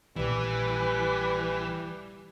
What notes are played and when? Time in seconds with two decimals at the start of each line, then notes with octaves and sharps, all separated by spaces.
0.16 A#1 A#2 E3 G3 B4